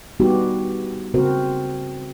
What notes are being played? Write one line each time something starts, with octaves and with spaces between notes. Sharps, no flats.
G3 B3 D#4 F#4 G4
C#3 C4 F#4 A#4 C5